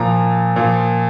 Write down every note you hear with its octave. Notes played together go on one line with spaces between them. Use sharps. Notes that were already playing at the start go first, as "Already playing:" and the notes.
Already playing: A#2 F3 A#5
A#2 F3